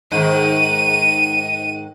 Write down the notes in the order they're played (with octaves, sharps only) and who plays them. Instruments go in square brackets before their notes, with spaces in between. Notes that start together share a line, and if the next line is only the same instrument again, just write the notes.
[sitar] G#2 D#3 [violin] D#7